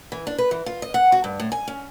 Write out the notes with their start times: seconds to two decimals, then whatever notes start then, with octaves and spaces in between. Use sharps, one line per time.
0.12 E3
0.27 D4
0.38 B4
0.51 E3
0.66 F4
0.82 D#5
0.94 F#5
1.12 F#4
1.24 G2
1.40 A2
1.52 G#5
1.68 C#4